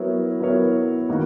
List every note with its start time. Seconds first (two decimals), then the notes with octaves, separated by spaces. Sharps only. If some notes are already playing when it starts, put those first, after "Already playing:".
Already playing: F#3 B3 E4 A#4 C#5
0.40 F#3 B3 E4 A#4 C#5
1.09 D#3 A#3 D#4 F#4